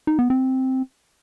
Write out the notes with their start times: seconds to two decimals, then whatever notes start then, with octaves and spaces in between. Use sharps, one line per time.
0.07 D#4
0.19 B3
0.30 C4